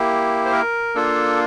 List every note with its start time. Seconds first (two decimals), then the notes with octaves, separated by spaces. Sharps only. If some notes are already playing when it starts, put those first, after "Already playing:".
Already playing: A#3 E4 G4
0.45 C5
0.52 A#4
0.95 A#3 D4 F4 A4